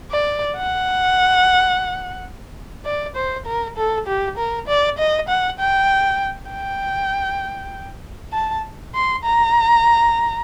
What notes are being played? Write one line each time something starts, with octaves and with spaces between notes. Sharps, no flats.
D5
F#5
D5
C5
A#4
A4
G4
A#4
D5
D#5
F#5
G5
G5
A5
C6
A#5